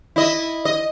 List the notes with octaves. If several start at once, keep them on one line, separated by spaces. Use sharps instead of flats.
E4 D#5
D#5